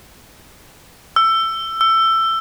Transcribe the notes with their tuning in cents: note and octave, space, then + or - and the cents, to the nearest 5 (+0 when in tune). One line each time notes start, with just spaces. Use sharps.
E6 +15
E6 +15